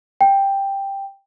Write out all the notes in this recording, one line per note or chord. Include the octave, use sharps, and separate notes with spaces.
G5